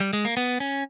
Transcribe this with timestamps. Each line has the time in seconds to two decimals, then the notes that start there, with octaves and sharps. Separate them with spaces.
0.01 G3
0.13 G#3
0.25 A#3
0.37 B3
0.60 C#4